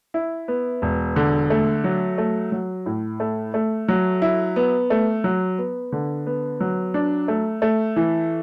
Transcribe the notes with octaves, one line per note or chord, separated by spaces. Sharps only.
E4
B3
E1
D3
A3
F#3
A3
F#3
A2
A3
A3
F#3
E4
B3
A3
F#3
B3
D3
B3
F#3
D4
A3
A3
E3